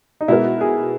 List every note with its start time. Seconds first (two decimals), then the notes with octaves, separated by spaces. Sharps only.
0.21 D#4
0.28 B2 G#3 B3 E4 F#4 A#4
0.61 G#4